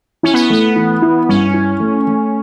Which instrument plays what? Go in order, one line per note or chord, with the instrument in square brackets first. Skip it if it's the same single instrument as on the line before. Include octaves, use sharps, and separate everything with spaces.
[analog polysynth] C#4 [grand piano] E4
[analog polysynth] B3
[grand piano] A3 [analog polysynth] B3
[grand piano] E3
E4
[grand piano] G2 [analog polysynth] C#4
[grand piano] E4
A3
A3